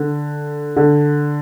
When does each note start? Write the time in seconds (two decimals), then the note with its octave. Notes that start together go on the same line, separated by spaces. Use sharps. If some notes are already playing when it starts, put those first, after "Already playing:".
Already playing: D3
0.76 D3